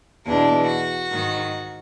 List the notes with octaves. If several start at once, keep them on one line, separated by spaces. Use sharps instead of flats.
E2 B2 D4
F#4
G#2 D#3